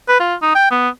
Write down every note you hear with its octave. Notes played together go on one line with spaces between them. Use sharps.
B4
F4
D#4
G5
B3